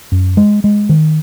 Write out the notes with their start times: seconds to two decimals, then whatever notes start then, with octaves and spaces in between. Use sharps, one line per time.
0.12 F#2
0.37 G#3
0.64 G#3
0.89 D#3